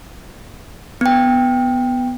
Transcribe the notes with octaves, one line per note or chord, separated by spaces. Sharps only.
B3 G5